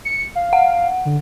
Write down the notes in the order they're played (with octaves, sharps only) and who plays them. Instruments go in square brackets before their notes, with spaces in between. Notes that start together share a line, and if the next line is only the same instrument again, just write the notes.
[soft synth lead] C#7
F5
[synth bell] F#5
[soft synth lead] D3